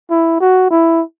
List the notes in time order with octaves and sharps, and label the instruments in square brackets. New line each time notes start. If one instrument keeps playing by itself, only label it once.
[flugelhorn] E4
F#4
E4